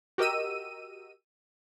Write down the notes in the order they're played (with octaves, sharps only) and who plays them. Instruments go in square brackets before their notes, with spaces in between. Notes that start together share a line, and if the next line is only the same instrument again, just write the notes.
[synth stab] F#4 G4 A#4 D#5 E6 D#7